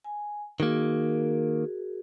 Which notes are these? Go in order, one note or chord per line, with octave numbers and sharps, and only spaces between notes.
G#5
D#3 A#3 F#4 G#4 A#4